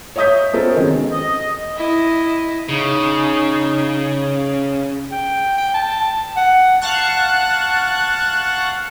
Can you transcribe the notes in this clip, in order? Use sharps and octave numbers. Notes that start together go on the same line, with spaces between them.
C#5 D#5 E5 D#6 G6 B6
B3 C#4 F4 A4 A#4 C5
F#2 C3 D#3 G#3 D#4
D#5
E4 D#5
C#3 D#4
G5
G5
A5
F#5
F5 F#5 A5 C#6 F#6